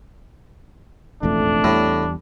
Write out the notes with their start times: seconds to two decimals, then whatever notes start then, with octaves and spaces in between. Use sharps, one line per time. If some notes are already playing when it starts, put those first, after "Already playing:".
1.23 E1 A1 F2 A3 D4
1.64 E2 A2 G3